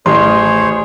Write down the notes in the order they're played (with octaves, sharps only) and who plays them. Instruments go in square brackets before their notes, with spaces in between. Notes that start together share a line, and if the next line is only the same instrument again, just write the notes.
[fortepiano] A1 [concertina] G#4 C5 C#5 [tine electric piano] C6